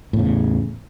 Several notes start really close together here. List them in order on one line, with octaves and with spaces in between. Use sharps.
A2 E2 C#3